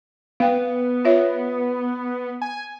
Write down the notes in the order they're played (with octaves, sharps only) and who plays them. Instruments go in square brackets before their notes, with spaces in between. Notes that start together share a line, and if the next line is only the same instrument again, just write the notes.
[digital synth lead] B3 [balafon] F5 G5
[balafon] F4 C#5 E5
[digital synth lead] G#5